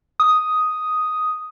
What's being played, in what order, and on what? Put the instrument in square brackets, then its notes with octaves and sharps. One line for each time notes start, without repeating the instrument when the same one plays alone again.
[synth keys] D#6